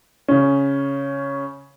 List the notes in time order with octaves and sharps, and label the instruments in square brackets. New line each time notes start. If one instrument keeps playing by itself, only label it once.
[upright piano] C#3 C#4